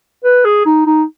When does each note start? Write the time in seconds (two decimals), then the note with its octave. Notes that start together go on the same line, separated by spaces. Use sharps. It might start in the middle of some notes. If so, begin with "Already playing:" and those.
0.24 B4
0.45 G#4
0.66 D#4
0.86 D#4